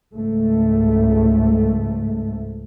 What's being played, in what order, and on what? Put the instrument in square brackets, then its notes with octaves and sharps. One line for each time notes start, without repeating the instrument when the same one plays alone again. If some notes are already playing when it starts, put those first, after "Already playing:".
[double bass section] C#2 G#2 A3